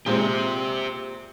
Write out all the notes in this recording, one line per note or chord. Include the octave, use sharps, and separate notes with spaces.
A#2 G#3 C4 G4 C5